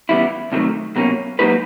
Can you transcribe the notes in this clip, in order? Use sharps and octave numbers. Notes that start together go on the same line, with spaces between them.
C#3 E3 G3 B3 E4
C2 C3 D#3 F#3 A3
C2 B2 F#3 A#3 C#4
F#3 A#3 D#4 G4 B4